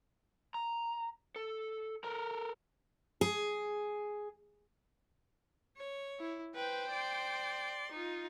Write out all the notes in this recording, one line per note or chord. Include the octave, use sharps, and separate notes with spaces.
A#5
A4
A4 A#4 A#5
G#4
C#5
E4
B4 C5 G5
D5 C6
D#4 F4